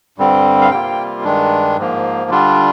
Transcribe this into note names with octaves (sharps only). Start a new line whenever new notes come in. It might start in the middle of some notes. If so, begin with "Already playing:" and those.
G2 D3 G3 C4
F5
C3 G3 A#3 F4 G5
G2 D#3 G#3 D4
G#2 F3 A#3
D3 G3 D4 F4